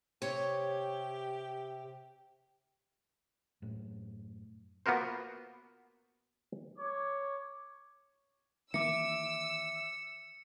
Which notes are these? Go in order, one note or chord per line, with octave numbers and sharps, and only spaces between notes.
C3 G4 C#5
F#2 A2
A#3 B3 F4 F#4 A#4 C5
C#5 D6
D#3 E3 A#3 E5 D6 E6 C#7 D7